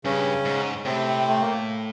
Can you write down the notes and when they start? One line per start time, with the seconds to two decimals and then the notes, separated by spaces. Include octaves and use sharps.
0.04 G2 C#3 C#4
0.45 G#2
0.85 A2 C3 C4
1.29 A3
1.41 A#3